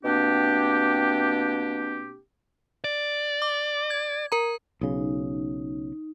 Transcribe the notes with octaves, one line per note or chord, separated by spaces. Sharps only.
B2 A#3 C4 D4 G4
D5
D6
G#6
A#4 A#5
B1 C#3 D#4